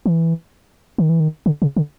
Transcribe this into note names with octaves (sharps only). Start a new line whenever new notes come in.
E3
D#3
E3
D#3
D3
C#3
D3